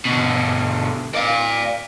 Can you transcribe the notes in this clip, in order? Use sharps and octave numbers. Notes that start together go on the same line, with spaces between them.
B2 D3
D5 F5